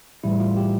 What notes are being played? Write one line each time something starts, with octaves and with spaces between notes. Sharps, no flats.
A2 E3 G3 E4
F4
G4